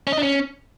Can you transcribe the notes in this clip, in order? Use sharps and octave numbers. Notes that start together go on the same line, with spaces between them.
C#4
D#5
D4
C#4